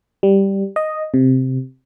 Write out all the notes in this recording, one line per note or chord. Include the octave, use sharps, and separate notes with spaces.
G3
D#5
C3